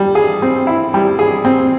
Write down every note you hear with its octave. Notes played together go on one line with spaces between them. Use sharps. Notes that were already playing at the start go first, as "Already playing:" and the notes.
Already playing: G3
G#4
C4
E4
G3
G#4
C4